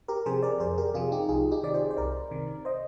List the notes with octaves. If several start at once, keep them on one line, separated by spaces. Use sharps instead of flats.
G4 A#4
C3 F3 G#4 C5
A#4 D5
F2 G#4 C5
G4 A#4
C3 F3 F4 G#4
D#4 G4
C2 F4 G#4
D#4 G4
C3 D#3 D5
G#4 C5
C5
C2 A#4 D5
C3 D#3
C5 D#5